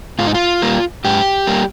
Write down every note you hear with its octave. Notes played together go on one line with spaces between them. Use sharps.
G#2 F4
D#4
F4
G3 A#3
G#2 G4
G3 A#3